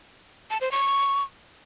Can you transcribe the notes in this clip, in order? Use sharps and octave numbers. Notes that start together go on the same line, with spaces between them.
A5
C5
C#6